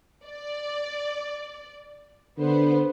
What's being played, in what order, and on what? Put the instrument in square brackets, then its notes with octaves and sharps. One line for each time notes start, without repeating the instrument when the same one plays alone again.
[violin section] D5
[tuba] D3 [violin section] B3 C5